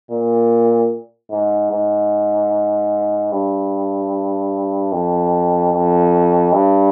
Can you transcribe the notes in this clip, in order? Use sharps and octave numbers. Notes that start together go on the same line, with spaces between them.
A#2
G#2
G#2
G2
F2
F2
G2